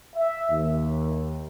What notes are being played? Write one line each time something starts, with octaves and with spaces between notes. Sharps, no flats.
E5
D#2